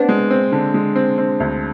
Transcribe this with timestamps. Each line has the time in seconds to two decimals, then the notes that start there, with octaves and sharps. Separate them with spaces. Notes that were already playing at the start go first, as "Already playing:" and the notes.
Already playing: B3 C4 D4
0.09 G#3
0.31 C4
0.52 D3
0.74 G#3
0.96 C4
1.18 C4
1.40 D2